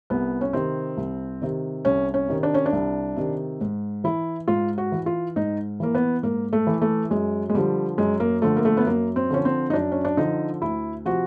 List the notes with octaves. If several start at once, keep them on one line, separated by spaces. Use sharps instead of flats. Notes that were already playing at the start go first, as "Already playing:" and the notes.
C2 B3
C#4
C3 D#3 C4
C2
C3 D#3
C2 C#4
C#4
C3 D#3
D4
C#4
D4
C2
C3 D#3
G#2
E3 E4
G#2 F4
F#4
E3
F4
G#2 D#4
E3 A#3
B3
G#2 A#3
A3
E3
A3
F#2 G#3
G#3
D3 F3 G3
F#2 G#3
A#3
D3 F3 A3
A#3
A3
B3
F#2 A#3
C4
D3 F3 C#4
C4
D#4
F#2 D4
C#4
D4
D3 F3 D#4
D2 E4
C3 F3 F#4